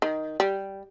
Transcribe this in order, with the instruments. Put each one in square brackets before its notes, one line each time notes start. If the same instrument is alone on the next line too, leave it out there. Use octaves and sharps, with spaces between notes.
[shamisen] D#3
G3